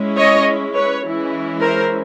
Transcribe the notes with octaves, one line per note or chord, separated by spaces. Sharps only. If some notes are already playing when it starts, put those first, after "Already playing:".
Already playing: G#3 C#4 E4
C#5 D#5
B4 C#5
E3 G#3 C#4 E4
A#4 C5